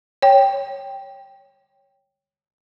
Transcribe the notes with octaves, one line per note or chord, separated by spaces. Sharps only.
C#5 G5